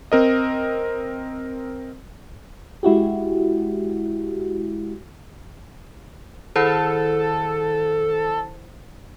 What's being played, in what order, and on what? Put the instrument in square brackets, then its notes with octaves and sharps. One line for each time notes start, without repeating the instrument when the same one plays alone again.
[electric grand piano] C4 A#4 D#5
[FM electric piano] G#3 E4 F#4 G4
[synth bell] D#3 E4 C5 [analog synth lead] A4